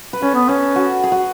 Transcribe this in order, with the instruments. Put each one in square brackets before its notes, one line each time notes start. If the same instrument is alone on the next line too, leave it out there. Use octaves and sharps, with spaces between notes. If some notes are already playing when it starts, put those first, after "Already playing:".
[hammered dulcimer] B4
[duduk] C#4 [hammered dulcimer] A4
[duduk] B3
[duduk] C#4 [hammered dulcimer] A4
[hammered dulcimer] F#4
G#4
F#4